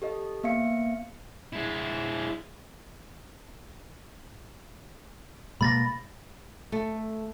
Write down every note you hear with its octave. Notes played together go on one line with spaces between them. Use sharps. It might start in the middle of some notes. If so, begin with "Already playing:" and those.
G4 A4 D#5
A#3 B3 E5 F5 C#7
G#3 E4
B2 G#3 A#3 B5 A6 A#6
A3